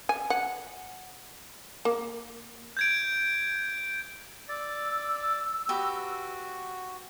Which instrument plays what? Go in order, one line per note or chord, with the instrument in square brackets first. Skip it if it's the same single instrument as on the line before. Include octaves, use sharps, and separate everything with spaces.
[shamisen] G#5
F#5
A#3
[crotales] G6 G#6 D7
[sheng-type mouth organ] D5 [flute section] E6
[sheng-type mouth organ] F#4 [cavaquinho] G4 B4 D#5